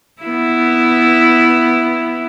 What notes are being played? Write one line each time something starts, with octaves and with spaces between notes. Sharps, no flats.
B3 E4